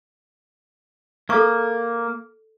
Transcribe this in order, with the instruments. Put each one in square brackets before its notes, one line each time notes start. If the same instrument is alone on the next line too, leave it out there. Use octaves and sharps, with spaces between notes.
[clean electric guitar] A#3 [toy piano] A4 C#6